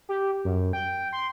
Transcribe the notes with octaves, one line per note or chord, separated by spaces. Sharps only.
G4
F#2
G5
C6